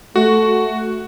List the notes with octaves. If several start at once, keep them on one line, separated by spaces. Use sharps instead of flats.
A3 F#4